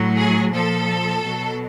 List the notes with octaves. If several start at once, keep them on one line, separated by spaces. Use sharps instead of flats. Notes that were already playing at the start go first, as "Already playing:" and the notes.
Already playing: A2 F#3
G#4
A#2 F3 A4
B2 F#3